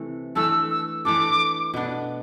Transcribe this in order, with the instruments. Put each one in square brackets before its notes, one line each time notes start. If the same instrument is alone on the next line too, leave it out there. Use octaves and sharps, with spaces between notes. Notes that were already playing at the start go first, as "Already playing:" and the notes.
Already playing: [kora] C3 E3 A3
[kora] E3 A3 D4 A4 [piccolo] E6
[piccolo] E6
[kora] E3 A3 D4 A4 [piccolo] D6
[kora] B2 B3 D4